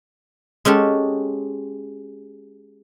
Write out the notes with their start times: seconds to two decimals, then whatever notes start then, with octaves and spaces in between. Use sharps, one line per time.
0.65 G#3 C#4 G4 A4